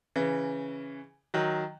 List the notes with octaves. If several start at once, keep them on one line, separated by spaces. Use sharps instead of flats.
C#3 E3
D#3 F#3